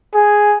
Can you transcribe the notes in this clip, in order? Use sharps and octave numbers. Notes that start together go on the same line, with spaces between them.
G#4